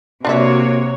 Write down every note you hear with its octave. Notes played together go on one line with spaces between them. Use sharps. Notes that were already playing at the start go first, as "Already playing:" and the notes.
C3 A#3 D4 F#4 B4 C#5 E5